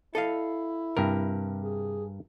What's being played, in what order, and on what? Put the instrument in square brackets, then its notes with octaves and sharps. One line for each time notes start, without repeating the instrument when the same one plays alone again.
[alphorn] E4 [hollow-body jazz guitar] A4 D#5 F5
[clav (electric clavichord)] G2 A#4 [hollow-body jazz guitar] C3
[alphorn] G#4